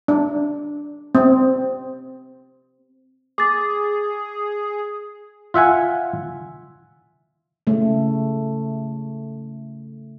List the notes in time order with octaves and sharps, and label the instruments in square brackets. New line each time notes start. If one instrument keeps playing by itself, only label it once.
[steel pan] D4
C4
[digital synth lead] G#4 [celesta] D6 A6
[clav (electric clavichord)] F4 E5 F#5 G#5
[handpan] C#3 A3